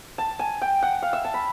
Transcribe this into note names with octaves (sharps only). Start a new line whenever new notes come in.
A5
G#5
G5
F#5
F5
E5
A5
B5